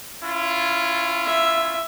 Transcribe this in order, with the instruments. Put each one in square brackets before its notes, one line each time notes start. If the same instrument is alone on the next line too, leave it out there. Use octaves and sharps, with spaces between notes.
[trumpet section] C#4 E4 F4
[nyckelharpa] E5